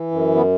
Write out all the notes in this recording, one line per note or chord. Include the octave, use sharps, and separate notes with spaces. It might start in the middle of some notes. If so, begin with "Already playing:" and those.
Already playing: E3
F#2
B3